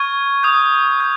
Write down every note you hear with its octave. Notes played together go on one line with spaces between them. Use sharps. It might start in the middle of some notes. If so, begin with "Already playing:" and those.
Already playing: C#6 F6 G#6
D#6 G6
G6